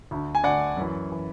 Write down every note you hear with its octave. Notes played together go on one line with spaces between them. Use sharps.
D2 D3
G#5
D2 D3 D5 F#5
F#2 E3
E3